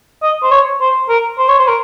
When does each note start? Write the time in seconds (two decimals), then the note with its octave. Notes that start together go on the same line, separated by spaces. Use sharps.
0.22 D#5
0.43 C5
0.51 C#5
0.81 C5
1.09 A#4
1.38 C5
1.48 C#5
1.59 C5
1.68 A#4